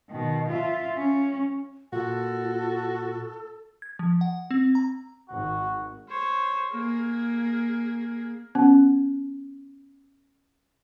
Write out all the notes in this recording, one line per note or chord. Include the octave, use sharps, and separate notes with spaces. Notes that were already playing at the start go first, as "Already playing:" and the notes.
B2 D#3
F4 E5
C#4
A#2 F4 F#4 A4
G#6
F3
F#5
C4
A#5
G#1 D#3 F#4
C5 C#5
A#3 G#4
B3 C#4